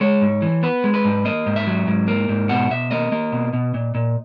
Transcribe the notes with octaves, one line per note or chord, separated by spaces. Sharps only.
G#3 C#5
G#2
E3
B3 B4
G#3
B4
G#2
A#3 D#5
G#2
E5
F#3
G#2
A#3
G#2
B2 F#5
B2 E5
A#3 D#5
A#3
B2
B2
A#2
A#2